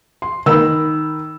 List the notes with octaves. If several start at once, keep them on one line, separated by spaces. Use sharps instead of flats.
C6
D#3 A#4 B5 E6